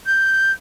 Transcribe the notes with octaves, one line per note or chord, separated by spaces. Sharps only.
G6